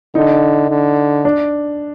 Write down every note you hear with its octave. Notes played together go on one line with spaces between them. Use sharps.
D3 D#4
D3
D4